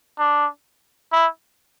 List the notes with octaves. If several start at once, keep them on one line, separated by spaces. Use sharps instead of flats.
D4
E4